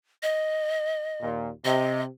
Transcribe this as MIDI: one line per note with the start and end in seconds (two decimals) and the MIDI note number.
0.23 1.28 75
1.22 1.50 39
1.22 1.50 46
1.65 2.05 48
1.65 2.02 75